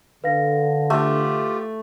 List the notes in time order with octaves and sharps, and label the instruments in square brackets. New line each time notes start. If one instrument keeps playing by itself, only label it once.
[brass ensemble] D3 [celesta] B4 F5 A#6
[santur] A3 [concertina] F4 G4